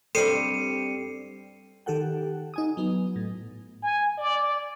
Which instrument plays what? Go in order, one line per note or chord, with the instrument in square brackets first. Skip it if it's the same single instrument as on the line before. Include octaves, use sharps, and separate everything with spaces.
[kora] G2 G3 C4 [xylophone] A4 [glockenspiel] C7 C#7 D#7
[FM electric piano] D#3 G4 A4 F#5 G5
D#4 G#5 D#6
F#3 B3
A2
[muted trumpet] G#5
D5